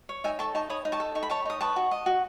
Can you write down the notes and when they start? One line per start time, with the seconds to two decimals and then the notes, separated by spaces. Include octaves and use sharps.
0.09 C#5
0.24 D#4 E5 G#5
0.39 A4 A5 C#6
0.55 D#4 A5 C#6
0.70 C#5 B5 D#6
0.85 D#4
0.92 A5 C#6
1.00 A4
1.15 D#4 C#6
1.23 B5
1.30 C#5 A5 C#6
1.45 D#4 D#6
1.60 B4 A5 C#6
1.76 F#4
1.91 D#5
2.06 F#4